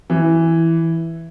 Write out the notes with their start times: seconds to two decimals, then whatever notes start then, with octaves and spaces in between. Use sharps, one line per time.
0.10 E3